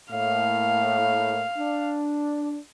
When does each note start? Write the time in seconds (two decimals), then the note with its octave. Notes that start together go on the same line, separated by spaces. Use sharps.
0.11 A2 A#3 F5
1.58 D4